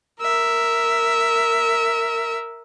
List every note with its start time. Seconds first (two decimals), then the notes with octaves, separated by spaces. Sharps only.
0.21 A#4 E5